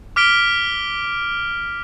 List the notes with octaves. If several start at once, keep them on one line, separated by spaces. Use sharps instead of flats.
D6 F6 B6 D7 G7